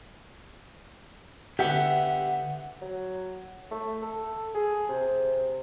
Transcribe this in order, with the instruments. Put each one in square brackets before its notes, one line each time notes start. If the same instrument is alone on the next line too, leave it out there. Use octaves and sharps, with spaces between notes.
[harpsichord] D3 B3 [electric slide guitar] G4 E5 F#5
[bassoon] F#3
A3
A4
G#4
C3